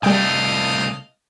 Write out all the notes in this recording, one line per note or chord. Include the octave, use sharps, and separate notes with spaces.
C2 G3 A3 D#5 F5 G5